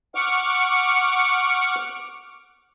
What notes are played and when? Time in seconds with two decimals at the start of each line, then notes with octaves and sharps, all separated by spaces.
0.15 F#5 C#6 D6 F6